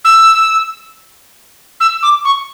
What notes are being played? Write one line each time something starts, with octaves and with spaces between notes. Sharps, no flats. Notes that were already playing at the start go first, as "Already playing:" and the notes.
E6
E6
D6
C#6